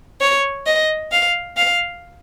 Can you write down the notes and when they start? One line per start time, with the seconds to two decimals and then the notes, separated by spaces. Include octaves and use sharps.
0.21 C#5
0.67 D#5
1.12 F5
1.57 F5